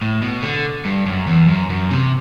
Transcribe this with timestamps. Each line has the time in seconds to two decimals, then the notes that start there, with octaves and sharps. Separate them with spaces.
0.02 A2
0.22 B2
0.43 D3
0.85 G2
1.06 F#2
1.27 E2
1.48 F#2
1.70 F#2
1.91 C3